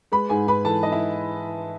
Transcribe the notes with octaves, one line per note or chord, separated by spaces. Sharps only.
G#3 B4 B5
G#2 G#4 G#5
G#2 B4 B5
E3 A4 A5
D#4 D#5
E4 E5